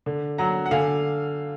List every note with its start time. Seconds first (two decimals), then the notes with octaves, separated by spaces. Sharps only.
0.06 D3
0.38 F#3 F#5 A#5
0.66 F#5
0.71 D3 F5 G#5